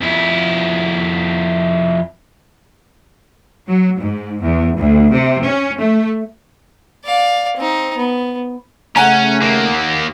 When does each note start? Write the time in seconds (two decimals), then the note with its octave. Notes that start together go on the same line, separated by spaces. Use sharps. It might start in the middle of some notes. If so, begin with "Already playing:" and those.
0.01 F2 E4
3.68 F#3
3.99 G#2
4.41 E2
4.77 D2
5.13 C3
5.45 C#4
5.81 A3
7.05 D5 F5
7.56 C4 D#4
7.97 B3
8.96 C#3 A3 C#4 F#5 G#5 A#5
9.42 D#2 A#3